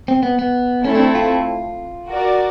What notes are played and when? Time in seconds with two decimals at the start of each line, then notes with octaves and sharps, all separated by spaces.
0.08 C4
0.23 B3
0.39 B3
0.84 A3 C4 C#4 E4
0.95 D4
1.15 F4
2.07 F#4 A#4 D5